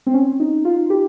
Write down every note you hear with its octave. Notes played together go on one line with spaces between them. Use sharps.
C4
C#4
D#4
F4
G4